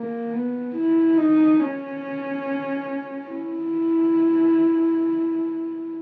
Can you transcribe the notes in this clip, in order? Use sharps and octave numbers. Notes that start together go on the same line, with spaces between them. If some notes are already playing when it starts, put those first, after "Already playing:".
Already playing: A#3
B3
E4
D#4
C#4
E4